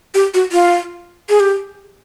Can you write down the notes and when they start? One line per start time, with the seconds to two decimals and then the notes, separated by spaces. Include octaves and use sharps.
0.14 G4
0.34 F#4
0.52 F4
1.29 G#4
1.40 G4